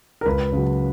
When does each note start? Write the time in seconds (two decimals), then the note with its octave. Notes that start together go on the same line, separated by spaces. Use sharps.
0.21 A#4
0.26 C#2 B4
0.52 C#3 F#3